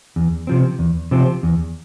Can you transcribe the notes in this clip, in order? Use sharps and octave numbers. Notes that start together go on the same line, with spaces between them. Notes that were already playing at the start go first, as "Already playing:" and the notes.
E2
C3 F3 C4
E2
C3 F3 C4
E2